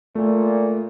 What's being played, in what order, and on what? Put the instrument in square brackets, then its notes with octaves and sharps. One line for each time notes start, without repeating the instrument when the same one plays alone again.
[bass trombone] A#2 [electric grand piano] A3